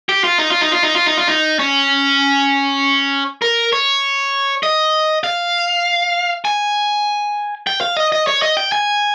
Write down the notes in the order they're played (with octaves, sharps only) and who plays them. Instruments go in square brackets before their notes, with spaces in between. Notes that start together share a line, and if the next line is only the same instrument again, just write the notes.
[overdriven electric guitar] G4
F4
D#4
F4
D#4
F4
D#4
F4
D#4
F4
D#4
C#4
A#4
C#5
D#5
F5
G#5
G5
F5
D#5
D#5
C#5
D#5
G5
G#5